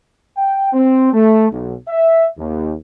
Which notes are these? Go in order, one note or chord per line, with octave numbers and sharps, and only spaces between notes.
G5
C4
A3
B1
E5
D#2